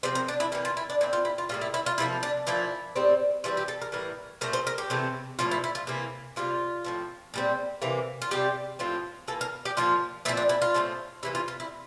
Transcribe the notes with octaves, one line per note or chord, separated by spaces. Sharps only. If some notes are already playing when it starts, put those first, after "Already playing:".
C3 F3 C4 C5
A#4
D4
E4
E3 A#3 G4
F4
E4
D4
A#2 A3 C4 E4
F4
E4
F4
A2 G3 A#3 F4
E4
E4
F4
C3 F3 A#3 E4
D4
A#2 F3 A#3 E4
A2 G3 C4
E3 G3 C4 F4
G4
A4
A#4
A2 E3 G3 A#4
A#2 A3 C4 A#4
C5
A#4
G4
C3 E3 A3 C4
A2 F3 A#3 F4
E4
E4
F4
C3 E3 A#3 E4
C3 G3 A#3 F4
A2 F3 C4
A#2 G3 C4
C3 E3 A#3
F4
C3 G3 C4 G4
A2 F3 C4 F4
E3 A#3 A4
A#4
G4
A#2 F3 A#3 F4
A#2 F3 C4 E4
D4
E4
F4
A2 F3 A3 C4
C3 E3 A#3 E4
F4
F4
E4